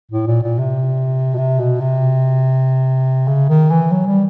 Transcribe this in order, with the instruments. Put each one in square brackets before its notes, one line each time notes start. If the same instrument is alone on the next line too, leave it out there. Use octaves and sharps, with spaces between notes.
[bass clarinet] A2
A#2
A#2
C3
B2
C3
B2
C3
C#3
D#3
E3
F#3
G3